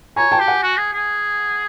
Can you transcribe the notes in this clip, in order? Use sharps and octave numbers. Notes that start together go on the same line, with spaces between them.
C#5 G#5 A#5
G5 A5
G4
F#5 G#5
F#4
G#4
G#4